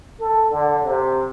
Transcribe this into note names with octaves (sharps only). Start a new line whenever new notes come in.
A4
D3
C3